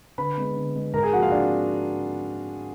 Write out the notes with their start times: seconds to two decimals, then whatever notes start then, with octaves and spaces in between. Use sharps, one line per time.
0.18 D3 B4 B5
0.37 G#3 B3
0.56 D3
0.75 G#3 B3
0.93 G#2 A#4 A#5
1.03 G#4 G#5
1.13 F3 F#4 F#5
1.17 A#3
1.22 F4 F5
1.32 D4 D5